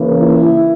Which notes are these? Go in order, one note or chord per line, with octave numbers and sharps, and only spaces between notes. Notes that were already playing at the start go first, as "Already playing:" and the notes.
Already playing: C#3 E3 A#3
E4